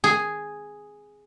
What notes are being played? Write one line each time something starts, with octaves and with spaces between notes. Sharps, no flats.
G#4